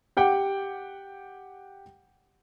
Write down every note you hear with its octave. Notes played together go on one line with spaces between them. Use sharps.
G4 F#5 G5 D6